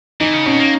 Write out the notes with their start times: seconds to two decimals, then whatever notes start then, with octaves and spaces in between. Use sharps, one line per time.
0.21 E3 D#4
0.33 C#3
0.46 B2 C#4
0.60 A#3